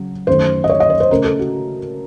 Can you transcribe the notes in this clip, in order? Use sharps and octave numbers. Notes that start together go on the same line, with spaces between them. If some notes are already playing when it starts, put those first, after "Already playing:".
Already playing: C#3 F#3
F#2 D#3 A3 C5
D#5
C#5
D#5
C#5
C5
C#3 A3 C#4 A#4
A4
F#4